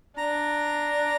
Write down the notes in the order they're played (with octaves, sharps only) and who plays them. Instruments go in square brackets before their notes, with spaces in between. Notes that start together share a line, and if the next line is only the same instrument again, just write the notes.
[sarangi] D4 [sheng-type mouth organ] A#5